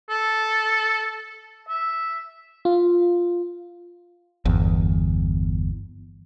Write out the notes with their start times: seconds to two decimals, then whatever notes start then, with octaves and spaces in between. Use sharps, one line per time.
0.10 A4
1.68 E5
2.65 F4
4.45 G1 E2